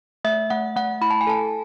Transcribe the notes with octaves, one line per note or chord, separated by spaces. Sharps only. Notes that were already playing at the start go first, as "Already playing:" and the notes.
A3 E5
A3 F#5
A3 F#5
E4 B5
A5
G#5
A4 A5